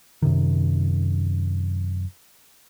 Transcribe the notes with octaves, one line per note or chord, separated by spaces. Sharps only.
F#2 C3 D#3